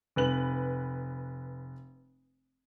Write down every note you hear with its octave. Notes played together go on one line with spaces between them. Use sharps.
F1 B4 F#7